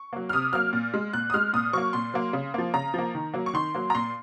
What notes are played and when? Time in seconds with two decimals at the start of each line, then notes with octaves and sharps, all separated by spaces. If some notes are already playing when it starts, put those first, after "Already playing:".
Already playing: C#6
0.13 F#3 A#3
0.29 F6
0.33 C3 D#6
0.53 F#3 A#3 F6
0.73 A#2
0.94 G#3
1.13 A#2 F#6
1.30 D#6
1.34 G#3 F6
1.53 A#2 D#6
1.73 F#3 A#3 C#6
1.93 A#2 C6
2.14 F#3 A#3
2.33 C#3
2.54 F3 A#3
2.74 C#3 A#5
2.94 F3 A#3
3.15 D#3
3.34 F#3 A#3
3.46 C#6
3.53 D#3 C6
3.74 F#3 A#3
3.90 A#5
3.94 A#2 C6